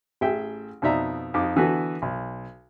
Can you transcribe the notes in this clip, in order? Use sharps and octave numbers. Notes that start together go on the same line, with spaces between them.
A1 G#4 E5 G5
F2 B2 D#4 D5 E5 A#5
F2 D#4 D6
D3 E3 B3 F#4 A4
B1